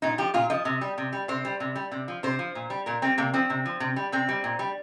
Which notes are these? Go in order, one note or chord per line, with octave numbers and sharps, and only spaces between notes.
A#2 D#4
F3 G4
A#2 F4
F3 D#5
C3
G3
C3
G3
C3 C5
G3
C3
G3
C3
F3
C3 C5
F3
A#2
G3
A#2 A#4
G3 C4
C3 A#3
F3 C4
C3
F3
C3
G3
C3 C4
G3
A#2
G3